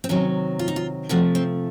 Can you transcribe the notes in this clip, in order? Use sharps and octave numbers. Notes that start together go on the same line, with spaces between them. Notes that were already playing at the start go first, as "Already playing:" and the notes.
C4
C3 D#3 F#3 C#4
F4
D#4
F4
C3 F3 A3 F#4
C4